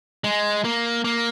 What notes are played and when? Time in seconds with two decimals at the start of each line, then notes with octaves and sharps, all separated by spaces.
0.24 G#3
0.64 A#3
1.05 A#3